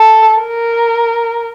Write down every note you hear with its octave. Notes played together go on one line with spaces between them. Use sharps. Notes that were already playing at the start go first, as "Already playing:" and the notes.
Already playing: A4
A#4